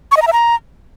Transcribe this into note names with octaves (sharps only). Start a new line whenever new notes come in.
C#6
D#5
A#5
E5
A#5